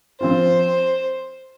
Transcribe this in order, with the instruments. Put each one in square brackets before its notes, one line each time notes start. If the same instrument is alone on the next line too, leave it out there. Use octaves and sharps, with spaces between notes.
[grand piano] F3 C4 F4 [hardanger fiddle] C5